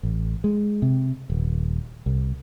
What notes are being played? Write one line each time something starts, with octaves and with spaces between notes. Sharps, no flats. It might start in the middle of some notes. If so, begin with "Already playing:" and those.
A1
G#3
C3
D#1
C2